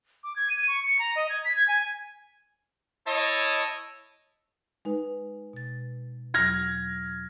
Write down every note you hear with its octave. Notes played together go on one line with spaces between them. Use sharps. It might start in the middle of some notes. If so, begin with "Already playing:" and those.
D6
G#6
D#7
C#6
C#7
A#5
D#5
G#6
B6
G#6
G#5
E4 C#5 D#5 A5
G#3 D#4 B4
B2 A6
E2 F#3 F6 G#6 A#6